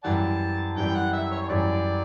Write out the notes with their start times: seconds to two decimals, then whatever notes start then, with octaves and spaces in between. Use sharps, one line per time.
0.04 F#2 E3 G3 D5 F#5 A5
0.77 F#2 E3 G3 G5
0.95 F#5
1.13 E5
1.31 C#5
1.43 C#5
1.49 F#2 E3 G3 D5